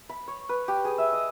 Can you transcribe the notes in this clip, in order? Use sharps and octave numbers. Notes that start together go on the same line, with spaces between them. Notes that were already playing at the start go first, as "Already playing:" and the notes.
B5
C#5
B4
G4
G#4
E5
D#5